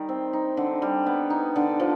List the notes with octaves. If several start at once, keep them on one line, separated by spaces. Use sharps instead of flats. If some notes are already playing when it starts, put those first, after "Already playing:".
Already playing: D#3 G3 D#4
C4
D#4
D3
G3
B3
D#4
D3
F3